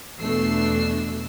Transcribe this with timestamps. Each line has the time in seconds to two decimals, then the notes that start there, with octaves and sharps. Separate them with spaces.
0.20 E2 B2 A3 D4 E6 C7